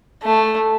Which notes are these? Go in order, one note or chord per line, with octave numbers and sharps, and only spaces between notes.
A3